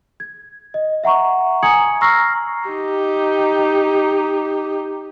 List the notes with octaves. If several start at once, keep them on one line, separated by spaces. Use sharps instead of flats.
G#6
D#5
E5 F#5 A#5 C#6
G#5 A#5 D#6 G#6 C#7 F#7
A#5 C#6 E6 F6 A#6 C7
D#4 G4